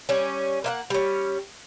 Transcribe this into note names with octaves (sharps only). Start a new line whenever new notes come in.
G3 C#4
A#3 E5 F#5
G3 C#4